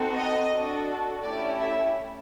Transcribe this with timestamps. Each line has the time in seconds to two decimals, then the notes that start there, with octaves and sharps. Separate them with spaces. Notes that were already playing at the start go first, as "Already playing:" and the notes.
Already playing: C4 D#4 F#4 A4
0.14 D#5
0.50 D4 F#4 A4
1.23 A3 C#4 E4 G4 D5
1.60 E5